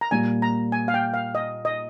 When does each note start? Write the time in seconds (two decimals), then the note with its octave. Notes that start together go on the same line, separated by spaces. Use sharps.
0.01 A#5
0.11 A#2 G3 A#3 G#5
0.42 A#5
0.72 G#5
0.88 F5
0.94 G5
1.14 F5
1.35 D#5
1.65 D#5